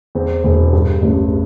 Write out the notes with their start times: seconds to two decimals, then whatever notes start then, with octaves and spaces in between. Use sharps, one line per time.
0.15 E2 C4
0.44 E1
0.73 G2
1.02 A1